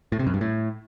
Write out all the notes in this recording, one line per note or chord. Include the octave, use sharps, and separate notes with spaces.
A2
C3
F#2
G2
A2